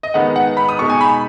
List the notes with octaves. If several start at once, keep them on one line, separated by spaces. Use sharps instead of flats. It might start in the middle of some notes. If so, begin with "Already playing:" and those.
D#5
D#3 G#3 B3 D#4 F#5
F#5
B5
D#6
B2 G#3 D#4 C#6
G#5
B5